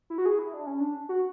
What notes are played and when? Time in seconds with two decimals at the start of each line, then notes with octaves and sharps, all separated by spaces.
0.10 E4
0.18 F#4
0.26 G#4
0.39 E4
0.54 D4
0.67 C#4
0.80 D4
1.09 F#4